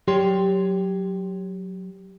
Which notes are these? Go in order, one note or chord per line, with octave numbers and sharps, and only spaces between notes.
F#3 G4 C#5 C6